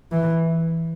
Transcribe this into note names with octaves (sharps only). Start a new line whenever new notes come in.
E3